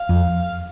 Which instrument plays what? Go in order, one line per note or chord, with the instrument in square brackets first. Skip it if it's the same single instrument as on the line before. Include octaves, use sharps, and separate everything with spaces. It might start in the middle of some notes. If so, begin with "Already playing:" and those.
Already playing: [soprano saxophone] F5
[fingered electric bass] F2